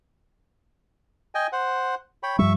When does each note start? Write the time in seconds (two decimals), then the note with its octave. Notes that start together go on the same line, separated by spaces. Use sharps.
1.35 D#5 G5 G#5
1.52 C5 F#5
2.23 C#5 G5 B5
2.39 G2 F3 G3 E5 C#6